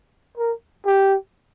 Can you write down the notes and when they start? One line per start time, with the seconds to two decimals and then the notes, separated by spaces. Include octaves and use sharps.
0.38 A#4
0.86 G4